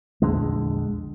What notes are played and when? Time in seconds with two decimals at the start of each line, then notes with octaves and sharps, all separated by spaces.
0.22 A#1 E2 D3 G#3